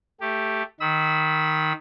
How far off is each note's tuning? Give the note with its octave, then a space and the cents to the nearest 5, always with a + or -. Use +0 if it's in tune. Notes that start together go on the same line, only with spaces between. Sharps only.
A3 +0 G4 +0
D#3 +0 B5 +0 E6 -30